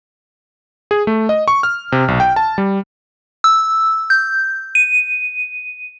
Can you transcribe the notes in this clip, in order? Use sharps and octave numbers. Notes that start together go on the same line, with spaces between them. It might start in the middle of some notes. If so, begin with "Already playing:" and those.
G#4
A3
D#5
C#6
F6
C3
B1
G5
A5
G3
E6
G6
D#7